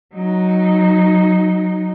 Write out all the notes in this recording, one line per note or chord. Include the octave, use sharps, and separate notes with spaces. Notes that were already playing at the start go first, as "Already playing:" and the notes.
F#3 D#4